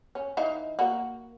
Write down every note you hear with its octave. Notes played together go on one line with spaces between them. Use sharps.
C#4
E3 D#4 F5
A#3 F#4